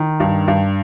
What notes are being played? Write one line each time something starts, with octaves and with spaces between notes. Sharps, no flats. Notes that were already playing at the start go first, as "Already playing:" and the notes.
Already playing: D#3
G2
G2